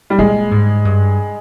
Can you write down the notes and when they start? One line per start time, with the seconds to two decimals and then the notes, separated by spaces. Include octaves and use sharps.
0.10 G3
0.19 A#2 G#3
0.51 G#2
0.85 G2